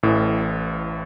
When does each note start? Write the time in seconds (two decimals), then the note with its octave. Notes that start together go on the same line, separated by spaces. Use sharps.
0.03 A1 A2 E3